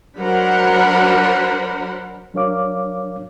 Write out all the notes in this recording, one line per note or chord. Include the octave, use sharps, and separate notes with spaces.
F#3 D4 A#4 C5 F#5 B5
F#3 D4 A#4 C#5 F5 D6